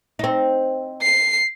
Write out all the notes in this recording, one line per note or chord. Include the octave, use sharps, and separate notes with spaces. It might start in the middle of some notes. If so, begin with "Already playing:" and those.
C4 D#4
C7